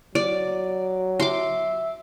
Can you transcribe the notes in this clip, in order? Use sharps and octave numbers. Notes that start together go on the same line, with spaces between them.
F#3 D5
E5 C6 D6